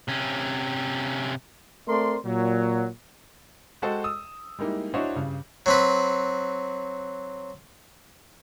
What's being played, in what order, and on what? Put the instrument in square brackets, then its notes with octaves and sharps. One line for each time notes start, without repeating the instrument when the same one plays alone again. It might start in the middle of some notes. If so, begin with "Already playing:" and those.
[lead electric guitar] C3 C#4
[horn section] A3 C4 A#4 D5 C6
A#2 F#3
[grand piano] G#3 F#4 A4 C5 D#5 G5
D#6 E6
G3 G#3 A#3 D#4 E4
D4 E4 F#4 C5 C#5 D#5
G2 C#3
[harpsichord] F#3 C4 B4